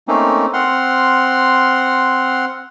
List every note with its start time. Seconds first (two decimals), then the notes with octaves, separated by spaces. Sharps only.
0.08 A3 A#3 C4 C#4 D#4
0.53 C4 F#5 C6 F6